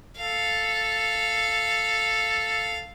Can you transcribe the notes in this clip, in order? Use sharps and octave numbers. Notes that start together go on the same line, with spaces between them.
A4 F5